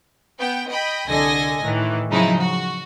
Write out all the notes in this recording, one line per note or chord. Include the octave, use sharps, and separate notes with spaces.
B3 G5
D#5 G5 B5
C2 D3 A4 D#5 G#5 A#6
A2 D#3 E3
C#3 F3 F#3 G#3 D#4 E4
F#4